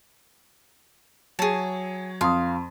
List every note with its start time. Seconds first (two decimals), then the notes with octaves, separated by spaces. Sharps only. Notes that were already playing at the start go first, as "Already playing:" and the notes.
1.39 F#3 G#4 C#5 A5
2.21 F2 F5 C6 D#6